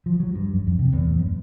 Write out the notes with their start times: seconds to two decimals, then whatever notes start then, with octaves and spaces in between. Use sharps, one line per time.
0.06 F3
0.20 F#3
0.35 G2
0.54 F#2
0.67 F2
0.79 C3
0.93 E2
1.06 A2
1.19 F#2